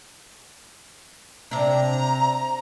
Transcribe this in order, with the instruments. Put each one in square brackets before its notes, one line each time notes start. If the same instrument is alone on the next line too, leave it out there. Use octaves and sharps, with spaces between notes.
[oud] C3 D4 [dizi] A#5